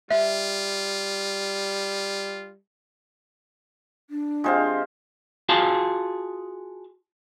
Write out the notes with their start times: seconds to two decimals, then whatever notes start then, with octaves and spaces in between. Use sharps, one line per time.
0.11 G3 F4 E5
4.10 D4
4.44 C3 F3 G#3 C5 F5
5.49 F4 F#4 G#4 F5 A5